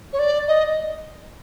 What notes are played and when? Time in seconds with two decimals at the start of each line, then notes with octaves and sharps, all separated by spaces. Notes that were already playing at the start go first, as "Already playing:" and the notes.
0.13 C#5
0.19 D5
0.48 D#5